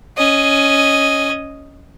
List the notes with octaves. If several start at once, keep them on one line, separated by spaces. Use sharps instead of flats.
C#4 D#5